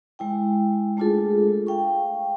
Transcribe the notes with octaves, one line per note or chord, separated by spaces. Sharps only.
G#3 E4 G5
G#3 A3 D4 F4 G#4 A4
F5 G5 C#6